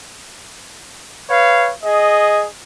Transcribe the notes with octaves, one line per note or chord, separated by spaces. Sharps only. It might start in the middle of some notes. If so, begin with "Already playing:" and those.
B4 C#5 F5
G#4 D#5